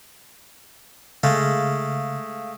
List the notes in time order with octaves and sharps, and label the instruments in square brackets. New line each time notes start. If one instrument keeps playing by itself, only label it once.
[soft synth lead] C#3 [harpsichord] G#3 A3 [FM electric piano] F5